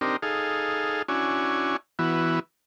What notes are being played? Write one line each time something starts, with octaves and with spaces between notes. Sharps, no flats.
C4 D4 D#4 G4 A#4
D#4 G#4 A4 F5
C#4 D4 E4 F#4 G#5
E3 B3 E4 F#4